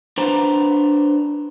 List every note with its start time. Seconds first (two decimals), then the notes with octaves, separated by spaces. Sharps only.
0.18 D4 B4 C5 A#5